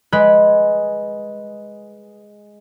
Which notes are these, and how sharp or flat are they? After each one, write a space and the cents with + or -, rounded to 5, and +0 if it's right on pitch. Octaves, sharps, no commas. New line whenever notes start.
G#3 +0 B4 -5